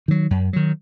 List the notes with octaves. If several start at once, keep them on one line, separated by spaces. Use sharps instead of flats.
D#3 F#3
F#2
D#3 F#3